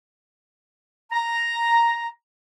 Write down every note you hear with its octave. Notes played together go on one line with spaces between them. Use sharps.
A#5